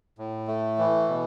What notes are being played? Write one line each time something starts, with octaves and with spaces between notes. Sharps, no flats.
A2
A3
E3
B2